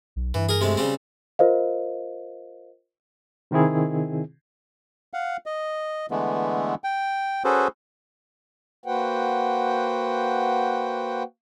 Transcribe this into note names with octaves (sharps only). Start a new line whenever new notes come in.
B1
G2 E3
G#4 A#4
C3 G#3 A3
C#3 G3 C4
F4 A#4 C5 D#5 F5
C3 D#3 C4 E4 G#4
F5 F#5
D#5
D3 E3 G#3 A3 B3
G5
C#4 F#4 G#4 A4 B4 C5
A#3 F#4 B4 C5 F#5 G5